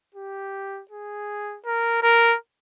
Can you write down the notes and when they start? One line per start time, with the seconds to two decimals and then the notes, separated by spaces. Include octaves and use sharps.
0.14 G4
0.91 G#4
1.65 A#4
2.03 A#4